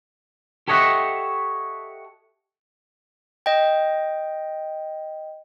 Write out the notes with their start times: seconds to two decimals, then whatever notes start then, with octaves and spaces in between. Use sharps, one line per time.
0.68 G4 A4 C#5 D#5 E5 F#5
3.46 D#5 G5